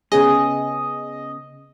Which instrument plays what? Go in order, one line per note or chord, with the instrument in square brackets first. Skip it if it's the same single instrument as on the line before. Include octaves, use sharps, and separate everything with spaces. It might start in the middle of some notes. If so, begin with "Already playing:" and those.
[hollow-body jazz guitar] C#3 B3 C#4 [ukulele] G#4 [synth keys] D#5